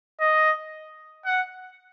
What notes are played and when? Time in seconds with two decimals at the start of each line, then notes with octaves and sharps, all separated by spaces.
0.21 D#5
1.25 F#5